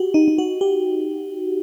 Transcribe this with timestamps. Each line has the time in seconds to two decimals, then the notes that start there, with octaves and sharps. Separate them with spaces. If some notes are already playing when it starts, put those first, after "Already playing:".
Already playing: F#4 G4
0.14 D#4
0.28 D#4
0.38 F#4
0.61 G4